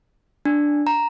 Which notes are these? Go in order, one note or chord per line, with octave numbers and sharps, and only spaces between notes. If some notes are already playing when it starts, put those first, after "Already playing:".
D4
A#5